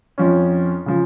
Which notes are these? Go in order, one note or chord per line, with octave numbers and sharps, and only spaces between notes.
F2 F3 C#4
C#3 F3